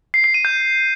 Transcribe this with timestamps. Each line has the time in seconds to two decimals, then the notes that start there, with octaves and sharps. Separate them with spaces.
0.14 C7
0.24 C7
0.34 D#7
0.45 G6